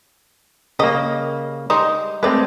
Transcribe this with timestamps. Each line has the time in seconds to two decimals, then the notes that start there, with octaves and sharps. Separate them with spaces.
0.79 C#3 G3 A#3 G4 D#5
1.70 G3 G#3 D#4
2.23 G#3 A3 C4 B4 D5